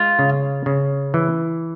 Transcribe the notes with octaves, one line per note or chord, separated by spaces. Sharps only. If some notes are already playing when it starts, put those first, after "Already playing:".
Already playing: G#3 F4
C#3
C#3
E3